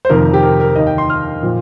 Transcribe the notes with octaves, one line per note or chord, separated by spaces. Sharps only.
C5
F2 C3 D#3 A#4
G4
A#4
A#4
D#2 D#3 D#5
G5
C6
F6
A#2 F3